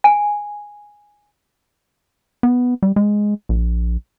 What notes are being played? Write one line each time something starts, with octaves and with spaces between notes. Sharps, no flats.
G#5
B3
G3
G#3
A#1